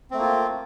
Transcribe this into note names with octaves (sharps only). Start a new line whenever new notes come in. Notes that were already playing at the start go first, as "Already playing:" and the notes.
A3 A#3 C4 F4